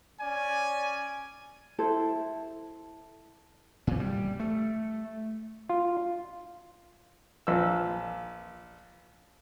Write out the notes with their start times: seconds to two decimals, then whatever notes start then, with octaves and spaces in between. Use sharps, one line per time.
0.20 C#4 D5 G#5
1.79 E4 A4 C5
3.87 A#2
4.00 G3
4.40 A3
5.69 F4
7.47 A#1 E6